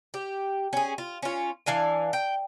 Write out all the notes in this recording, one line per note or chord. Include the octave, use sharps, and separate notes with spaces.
G4
C#4 G#4
F4
C#4 F4
E3 D4 F5 G#5
G5